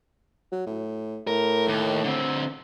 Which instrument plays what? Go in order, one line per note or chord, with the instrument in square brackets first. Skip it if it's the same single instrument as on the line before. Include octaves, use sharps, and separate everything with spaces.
[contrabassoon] F#3
A2
[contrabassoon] A2 [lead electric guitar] A#4
[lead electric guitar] D#2
D3 C4